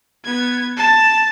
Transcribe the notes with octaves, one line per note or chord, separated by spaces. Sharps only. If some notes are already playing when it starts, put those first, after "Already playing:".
B3 G#6
A5